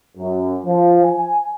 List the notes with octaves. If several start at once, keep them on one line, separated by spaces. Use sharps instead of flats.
F#2
F3
G#5